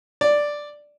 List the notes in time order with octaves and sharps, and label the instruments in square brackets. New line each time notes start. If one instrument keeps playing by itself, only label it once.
[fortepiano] D5